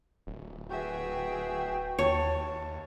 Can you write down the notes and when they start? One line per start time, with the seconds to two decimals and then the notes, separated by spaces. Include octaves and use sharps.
0.27 D1
0.71 F#4 G#4 B4 E5 G5
1.99 D#2 C#5 A5